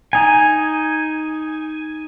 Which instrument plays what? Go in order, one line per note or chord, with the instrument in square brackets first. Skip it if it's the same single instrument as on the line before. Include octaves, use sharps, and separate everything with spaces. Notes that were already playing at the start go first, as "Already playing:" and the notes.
[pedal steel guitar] D#4 G#5